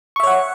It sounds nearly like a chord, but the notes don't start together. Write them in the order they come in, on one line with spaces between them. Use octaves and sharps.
C#6 E5 C#5 F#5